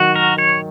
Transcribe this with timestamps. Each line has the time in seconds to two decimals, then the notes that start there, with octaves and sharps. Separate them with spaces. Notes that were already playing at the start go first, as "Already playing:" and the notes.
Already playing: D#3 F#3 F#4
0.16 A#4
0.38 C#5